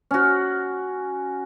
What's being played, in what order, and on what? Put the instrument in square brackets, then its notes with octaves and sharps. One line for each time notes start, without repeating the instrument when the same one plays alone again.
[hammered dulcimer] C#4 F#4